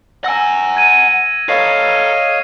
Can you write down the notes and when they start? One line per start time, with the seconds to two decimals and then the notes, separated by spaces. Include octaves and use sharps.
0.24 F#5 G#5 E6 A#6
0.77 G#6 D#7
1.49 A4 B4 C#5 D#5 F5 C7